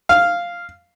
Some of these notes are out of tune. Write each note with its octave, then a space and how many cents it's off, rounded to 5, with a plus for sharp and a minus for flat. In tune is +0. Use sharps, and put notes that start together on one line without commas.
F5 -5